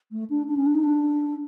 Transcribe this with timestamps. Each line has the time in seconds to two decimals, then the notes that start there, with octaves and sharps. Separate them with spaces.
0.11 A3
0.30 D4
0.48 D4
0.57 C#4
0.66 D4
0.75 D#4
0.84 D4